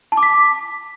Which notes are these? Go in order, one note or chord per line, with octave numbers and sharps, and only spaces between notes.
A5
D6
B6